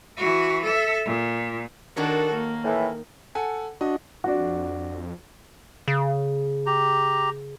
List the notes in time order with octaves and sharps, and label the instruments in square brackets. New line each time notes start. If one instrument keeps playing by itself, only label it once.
[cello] E3 F#4
A4 E5
A#2
[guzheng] D#3 A#4 C#5 [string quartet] D4 F#4 A4
[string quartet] A#3
[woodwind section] A2 E3
[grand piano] A4 F#5 G#5
[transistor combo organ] D4 F#4 [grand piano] D#5
[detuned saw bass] F2 [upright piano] D4 F#4
[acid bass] C#3
[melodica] G4 A#5